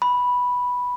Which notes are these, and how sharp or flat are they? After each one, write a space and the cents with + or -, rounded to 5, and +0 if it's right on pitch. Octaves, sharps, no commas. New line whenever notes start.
B5 -5